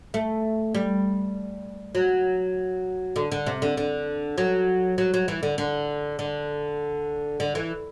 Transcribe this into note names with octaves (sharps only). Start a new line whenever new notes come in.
A3
G3
F#3
D3
D3
C3
D3
D3
F#3
F#3
F#3
E3
D3
D3
D3
D3
E3